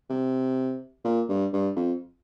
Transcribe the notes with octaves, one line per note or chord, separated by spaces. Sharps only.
C3
A#2
G2
G2
F2